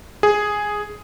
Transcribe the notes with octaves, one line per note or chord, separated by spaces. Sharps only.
G#4